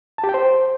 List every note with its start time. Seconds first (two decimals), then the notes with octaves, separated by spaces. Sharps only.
0.18 A5
0.24 G4
0.29 G5
0.34 C5